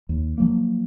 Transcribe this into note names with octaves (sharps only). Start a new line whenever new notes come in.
D#2
F3 F#3 A#3